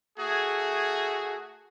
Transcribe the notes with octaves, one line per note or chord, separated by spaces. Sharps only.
A3 F#4 G#4